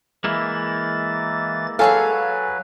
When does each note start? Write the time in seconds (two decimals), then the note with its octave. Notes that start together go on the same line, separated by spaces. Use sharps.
0.24 E3 G#3 A#3 E4 A6
1.79 F#3 G#4 A4 B4 C#5 F5 G#5